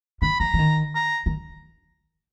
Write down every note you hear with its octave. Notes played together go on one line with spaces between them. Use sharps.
D#3 B5
E3 A#5
E3
D#3
A#5
D#3